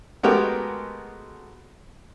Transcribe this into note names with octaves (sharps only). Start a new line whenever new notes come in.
G#3 A3 B3 F#4 G4 A#4